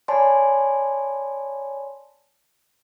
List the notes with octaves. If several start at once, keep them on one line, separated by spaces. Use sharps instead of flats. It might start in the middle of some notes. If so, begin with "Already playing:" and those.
C#5 D5 G#5 A5 B5 C6